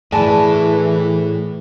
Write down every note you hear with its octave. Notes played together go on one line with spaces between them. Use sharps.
A2 E3 G#4 D5 G#5 A5 B5